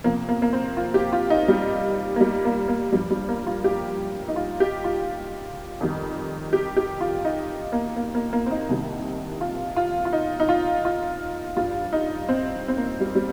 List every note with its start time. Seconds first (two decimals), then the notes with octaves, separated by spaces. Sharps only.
0.04 F2 C3 F3 A#3
0.29 A#3
0.42 A#3
0.53 C4
0.77 F4
0.94 G4
1.13 F4
1.30 D#4
1.48 G3
2.16 A#3
2.21 G3
2.45 A#3
2.68 A#3
2.92 G2 F3 G3
3.11 G3
3.29 A#3
3.47 F4
3.64 G4
4.28 D#4
4.36 F4
4.60 G4
4.84 F4
5.81 F2 D#3 G3
6.53 G4
6.77 G4
7.01 F4
7.25 D#4
7.72 A#3
7.96 A#3
8.15 A#3
8.33 A#3
8.46 C4
8.51 D#4
8.69 C2 C3 D#3 G3
9.41 F4
9.76 F4
10.05 F4
10.13 D#4
10.40 D#4
10.49 F4
10.85 F4
11.56 G2 G3 F4
11.93 D#4
12.29 C4
12.68 C4
12.77 A#3
13.01 G3
13.15 G3